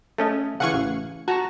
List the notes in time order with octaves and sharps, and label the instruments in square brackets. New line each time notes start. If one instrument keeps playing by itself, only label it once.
[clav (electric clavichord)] A3 C#4 D#5 [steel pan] A4
[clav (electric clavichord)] C#3 E3 [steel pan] F5 [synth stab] F#5 G#5 C#6
[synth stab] A1
[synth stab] F#4 [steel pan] A5 A#5